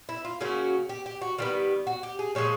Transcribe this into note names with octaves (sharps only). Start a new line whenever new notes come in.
E4
F4
C#3 F#3 A#3 C#4 F#4
G4
G4
F#4
D#3 G3 B3 F4
F#4
G4
G#4
A#2 F3 G#3 C#5